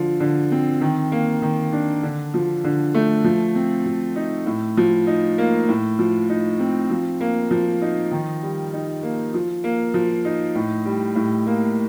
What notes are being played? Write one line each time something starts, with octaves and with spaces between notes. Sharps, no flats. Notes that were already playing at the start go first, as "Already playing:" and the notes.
Already playing: D3 F3
D3
C4
D#3
A#3
D#3
D4
D3
F3
D3
A3
F3
C4
F3
D#4
A2
F3
D#4
A#3
A2
F3
D#4
C4
F3
A#3
F3
D#4
D#3
G3
D#4
A#3
F3
A#3
F3
D#4
A2
G3
A2
A#3